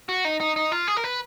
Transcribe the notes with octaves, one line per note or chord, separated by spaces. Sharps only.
F#4
D#4
D#4
D#4
F4
G#4
A#4
B4